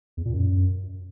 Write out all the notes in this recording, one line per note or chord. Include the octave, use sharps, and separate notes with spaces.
E2
A#2
F#2